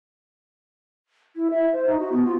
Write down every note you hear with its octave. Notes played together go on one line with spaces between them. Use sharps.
E4
E5
C5
D#4
F#4
B3
F4